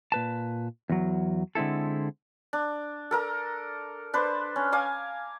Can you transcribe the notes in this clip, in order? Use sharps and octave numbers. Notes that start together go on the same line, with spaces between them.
A#2 B4 A5
E2 F#3
D3 G#3 C4 E4 A4
D4
A4 A#4 A#5
D4 B4 C5
C#4
F5 G#5 A#5 D6